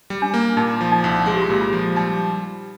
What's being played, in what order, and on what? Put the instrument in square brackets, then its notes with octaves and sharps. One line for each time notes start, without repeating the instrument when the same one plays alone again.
[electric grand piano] G3
[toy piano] D4
[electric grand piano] A#3
[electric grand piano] A#2 [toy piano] D#4
[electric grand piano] F3
[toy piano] D#4
[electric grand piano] C2
[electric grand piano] G#3 [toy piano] G#4
[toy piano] G4
F4
[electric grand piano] A#2 [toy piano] G4
[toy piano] F4
[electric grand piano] F3
[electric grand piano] G3 [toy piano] D#4